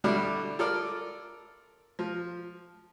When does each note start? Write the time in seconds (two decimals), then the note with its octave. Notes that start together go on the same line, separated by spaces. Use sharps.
0.04 D3 G3 E4 F#4 D5
0.59 F4 A4 A#4 D5
1.99 F3